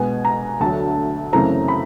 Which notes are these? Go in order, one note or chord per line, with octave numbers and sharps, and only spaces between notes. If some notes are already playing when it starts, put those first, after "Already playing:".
Already playing: B2 G#3 B3 G#5
A#5
D2 D3 F#3 A5
F#2 C#3 E3 A3 C4 A#5
B5